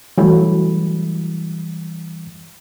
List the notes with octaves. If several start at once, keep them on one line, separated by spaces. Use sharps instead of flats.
E3 F#3 G3 A3 E4